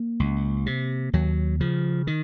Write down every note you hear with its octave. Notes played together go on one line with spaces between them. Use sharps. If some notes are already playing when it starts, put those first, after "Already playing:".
Already playing: A#3
C#2
C3
D#2 F#3
C#3 F3
D#3